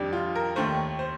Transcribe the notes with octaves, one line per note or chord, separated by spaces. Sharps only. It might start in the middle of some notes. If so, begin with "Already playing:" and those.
Already playing: F2 D#3 G3 D4 G4
F4
A#4
D#2 D#3 A3 C5
C5